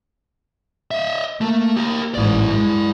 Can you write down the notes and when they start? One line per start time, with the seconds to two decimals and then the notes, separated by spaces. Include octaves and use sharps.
0.91 D#5 E5
1.41 A3 A#3
1.77 G4 A#4
2.15 A1 G#2 E4 D5
2.48 G2 G#3